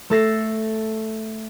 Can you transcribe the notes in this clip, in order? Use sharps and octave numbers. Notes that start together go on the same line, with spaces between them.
A3 A4 A#6 C7